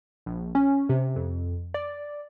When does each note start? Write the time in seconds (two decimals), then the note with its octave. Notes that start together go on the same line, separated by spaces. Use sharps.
0.26 A#1
0.55 C#4
0.89 C3
1.16 F2
1.74 D5